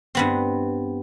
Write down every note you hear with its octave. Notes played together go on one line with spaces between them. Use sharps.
G2 B3 C4